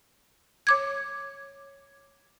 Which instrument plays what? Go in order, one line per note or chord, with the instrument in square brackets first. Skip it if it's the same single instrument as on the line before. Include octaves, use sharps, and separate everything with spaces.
[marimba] C#5 D6 G#6